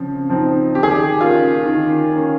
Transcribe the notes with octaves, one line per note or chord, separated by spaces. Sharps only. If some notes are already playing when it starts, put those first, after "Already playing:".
Already playing: C#3 F3 C4
F3 C4 D#4
D#3 G4
G#4
G4
A#3 C#4 F4
D#3
A#3 C#4